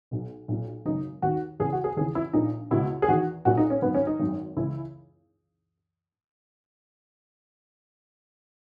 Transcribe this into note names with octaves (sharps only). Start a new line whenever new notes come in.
B1 B2
B1 A#2
G#1 F#2 C#3 D#4
D#2 D#3 F#4
E2 C#3 E3 G#4
F#4
G#4
D#2 C#3 E3 G#4
E4
A#1 A#2 D#4
C#2 B2 E4
G#4
E2 D#3 F#4
B1 A#2 F#4
D#4
C#4
G#1 F#2 D#3 B3
C#4
D#4
G#1 F#2 D#3
C#2 C#3 E3 E4